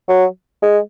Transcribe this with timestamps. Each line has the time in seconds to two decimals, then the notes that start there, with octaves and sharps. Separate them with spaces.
0.09 F#3
0.62 G#3